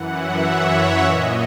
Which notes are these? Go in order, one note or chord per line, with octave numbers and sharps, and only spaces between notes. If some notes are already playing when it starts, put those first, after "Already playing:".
Already playing: F#2 E3 F#5
E5
C#5
A#2 D#5